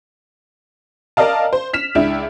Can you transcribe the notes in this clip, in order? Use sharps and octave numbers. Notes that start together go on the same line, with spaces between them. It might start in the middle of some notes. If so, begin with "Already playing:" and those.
A#4 D5 D#5 F5 A5
C5
F6 B6 E7
C#2 D4 E4